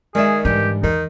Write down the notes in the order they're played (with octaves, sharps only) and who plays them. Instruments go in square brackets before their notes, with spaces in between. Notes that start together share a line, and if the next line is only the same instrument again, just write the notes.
[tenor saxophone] D#3 [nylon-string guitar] G#3 D5 E5 [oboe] G#4
[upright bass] G#2 [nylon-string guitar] D3 E3 G3 [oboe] G4
[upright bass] E2 [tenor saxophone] D#3 [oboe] D#4